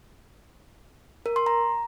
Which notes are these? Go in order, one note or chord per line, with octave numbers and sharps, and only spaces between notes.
A#4
C6
A#5